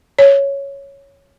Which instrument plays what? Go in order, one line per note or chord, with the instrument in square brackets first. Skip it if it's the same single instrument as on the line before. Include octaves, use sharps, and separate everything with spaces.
[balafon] C#5